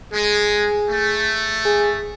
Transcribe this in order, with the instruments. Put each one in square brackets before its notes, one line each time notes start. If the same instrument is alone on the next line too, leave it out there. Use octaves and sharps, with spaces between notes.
[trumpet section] G#3 [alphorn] G#4
[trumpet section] A3
[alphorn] G#4